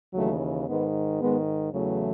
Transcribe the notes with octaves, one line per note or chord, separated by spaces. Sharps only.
D#2 C#3 E3 F#3 A3
G#2 D#3 G#3 B3
G#2 D#3 G#3 B3
E2 C#3 E3 F#3 A3